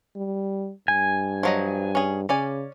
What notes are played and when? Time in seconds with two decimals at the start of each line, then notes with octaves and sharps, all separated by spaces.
0.16 G3
0.88 G2 G#5
1.43 F3 F#3 D#5
1.95 C#4 G#4
2.29 C#3 C#4 D5 G#5